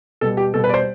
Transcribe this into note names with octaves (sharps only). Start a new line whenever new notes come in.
B2 G3 A4
G4
B2 G3 A4
B4
D5
C5